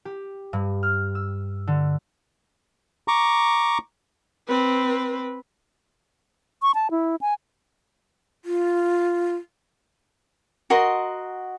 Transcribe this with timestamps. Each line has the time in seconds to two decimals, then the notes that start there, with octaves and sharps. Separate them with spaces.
0.05 G4
0.53 G2
0.83 F6
1.15 E6
1.67 D3
3.08 A#5 C#6 D6
4.48 C4 B4
6.62 C#6
6.75 A5
6.91 E4
7.21 G#5
8.43 F4
10.70 F#4 A#4 D#5 C6